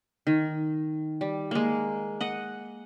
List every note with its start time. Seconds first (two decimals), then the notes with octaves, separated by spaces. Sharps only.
0.27 D#3
1.21 G3
1.51 G#3 A#3
2.21 D#5 F#5